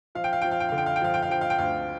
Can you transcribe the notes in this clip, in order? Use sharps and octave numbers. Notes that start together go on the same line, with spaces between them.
F3 F5
G5
F5
F3 G5
F5
G5
D3 F5
G5
F5
G5
F3 F5
G5
F5
F3 G5
F5
G5
D2 F5